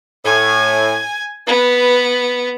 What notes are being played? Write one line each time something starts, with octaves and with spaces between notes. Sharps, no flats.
A2 G#5
B3 B4